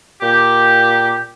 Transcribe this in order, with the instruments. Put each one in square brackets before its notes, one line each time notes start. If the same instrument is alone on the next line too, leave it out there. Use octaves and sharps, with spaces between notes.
[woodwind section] A#2 G4